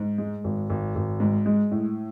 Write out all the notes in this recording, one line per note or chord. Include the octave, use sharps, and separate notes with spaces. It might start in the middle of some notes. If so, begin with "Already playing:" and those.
Already playing: G#2
G#3
G#1
G#1
G#1
G#2
G#3
A2